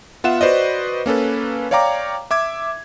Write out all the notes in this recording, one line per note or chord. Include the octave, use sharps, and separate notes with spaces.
B3 F4 E5 F#5 E7
F#4 B4 C5 D5 D#5
A#3 C#4 A4 B4
C#5 D5 F5 G5 A#5 D6
E5 D6 G#6